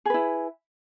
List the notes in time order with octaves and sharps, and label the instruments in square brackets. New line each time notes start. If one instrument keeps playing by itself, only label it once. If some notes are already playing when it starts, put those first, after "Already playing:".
[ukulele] G#4
B4
E4